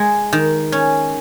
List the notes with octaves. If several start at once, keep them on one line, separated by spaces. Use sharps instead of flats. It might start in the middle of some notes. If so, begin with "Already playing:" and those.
Already playing: G#3
D#3
C#4